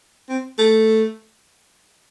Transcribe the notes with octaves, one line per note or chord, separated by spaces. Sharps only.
C4
A3